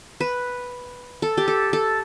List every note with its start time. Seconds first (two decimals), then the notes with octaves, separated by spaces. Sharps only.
0.21 B4
1.22 A4
1.38 G4
1.48 A4
1.73 A4